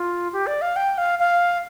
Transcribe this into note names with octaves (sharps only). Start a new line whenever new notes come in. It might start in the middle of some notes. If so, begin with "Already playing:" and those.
Already playing: F4
G4
D5
F5
G5
F5
F5